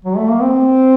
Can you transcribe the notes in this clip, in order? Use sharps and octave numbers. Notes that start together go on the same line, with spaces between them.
F#3
A3
A#3
C4